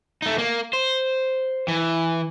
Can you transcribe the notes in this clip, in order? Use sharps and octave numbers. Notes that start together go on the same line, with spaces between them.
A3 D#4
A#3
C5
E3